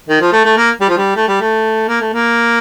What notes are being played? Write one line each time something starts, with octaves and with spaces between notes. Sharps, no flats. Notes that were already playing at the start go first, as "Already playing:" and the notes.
D#3
F3
A3
A3
A#3
G3
F3
G3
A3
G3
A3
A#3
A3
A#3